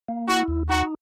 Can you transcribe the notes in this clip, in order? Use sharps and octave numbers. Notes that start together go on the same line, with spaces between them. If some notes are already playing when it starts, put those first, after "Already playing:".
A#3
E4 F#4
D#2
D#4 F#4